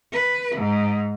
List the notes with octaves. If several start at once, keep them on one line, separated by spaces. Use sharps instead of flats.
B4
G#2